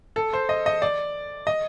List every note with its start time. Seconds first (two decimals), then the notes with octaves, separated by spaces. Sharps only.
0.16 A4
0.33 C5
0.49 D#5
0.66 D#5
0.82 D5
1.47 D#5